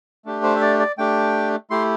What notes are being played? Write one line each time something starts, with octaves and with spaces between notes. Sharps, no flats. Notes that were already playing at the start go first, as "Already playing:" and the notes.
A3 D4 G4
C5
E5
D5
D5
A3 D4 G4 G5
A3 E4 G4 C6